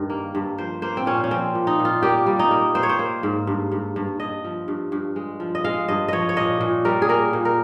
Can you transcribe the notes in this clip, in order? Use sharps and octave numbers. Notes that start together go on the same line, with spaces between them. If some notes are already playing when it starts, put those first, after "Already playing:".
Already playing: G2 D#3
A#3
G2
F3 C5
A#3 C5
C4
A#2 C#4
C#4
F3 C4
A#2
D#4
A#2
F4
A#3 G4
G3
D#4
A#3
A#3 C5
C#5
C5
A#3
G#2
G2
G2
G2
G2 D#5
F3
G2
G2
G#3
F3
D#5
G#3 F5
G2 D#5
F3 C#5 D#5
C#5
A#2 D#5
A#2
G3 A#4
G#4
A#3 A#4
A#2
A#4